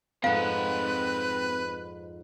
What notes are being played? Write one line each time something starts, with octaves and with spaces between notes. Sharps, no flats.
F2 G#2 C4 B4 F5 F#5